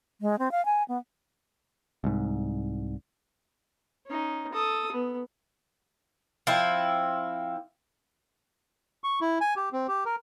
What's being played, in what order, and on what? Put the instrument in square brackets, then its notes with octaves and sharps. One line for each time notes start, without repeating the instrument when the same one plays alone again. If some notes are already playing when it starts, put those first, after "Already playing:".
[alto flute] G#3
C4
F5
G#5
B3
[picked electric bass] C2 G#2
[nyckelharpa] C#4 D#4
A4 D#6
B3
[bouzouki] F3 C4 E4
[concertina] C#6
E4
G#5
G4
C4
G4
A#4